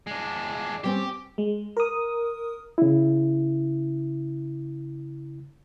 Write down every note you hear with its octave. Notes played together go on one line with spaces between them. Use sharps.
G#3 D4
G3 C4 C#4 G4
G#3
A#4 D#6
C#3 E4